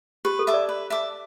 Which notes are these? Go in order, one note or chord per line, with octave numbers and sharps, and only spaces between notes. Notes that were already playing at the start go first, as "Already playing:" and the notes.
G4 B4
A4
E5 A5 D6
D5
B4
E5 A5 D6